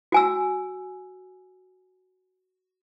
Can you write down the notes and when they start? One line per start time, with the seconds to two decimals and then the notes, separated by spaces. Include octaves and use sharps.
0.12 F#4 G#5 E6